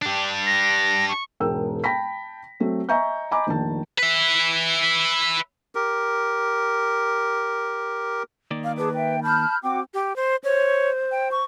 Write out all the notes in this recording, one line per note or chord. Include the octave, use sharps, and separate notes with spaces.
D4 G4
A#6
C#6
E1 G#2 A#4 G5 E6
G5 A5 B5 A#6 B6
F#3 A3 C4
D#5 E5 G#5 A#5 C#6 G6
D#5 G#5 A#5 B5 D6
F1 A#1 D#3 A5
B4 E5
G4 A#4
D#3 A#3 D5
F5
G#4 B4 A5 D6
E5 G5
A5 B5 F6 G6
C4 F#4 G5 D6
G4
C5
C5 C#5
G5
C#6